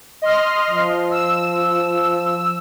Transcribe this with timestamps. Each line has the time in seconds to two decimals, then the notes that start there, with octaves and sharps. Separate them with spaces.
0.22 D#5 C6 F6
0.70 F3
1.11 E6